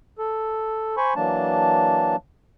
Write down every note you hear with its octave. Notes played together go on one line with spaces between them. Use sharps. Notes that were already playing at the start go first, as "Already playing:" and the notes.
A4
C5 G#5 B5 C#6
E3 F#3 A#3 D4 A5